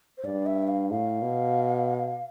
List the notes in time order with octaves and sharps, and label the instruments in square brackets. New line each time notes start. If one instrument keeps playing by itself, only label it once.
[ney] C5
[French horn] G2 [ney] D5
[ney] E5
F5
[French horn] A2 [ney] F5
[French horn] B2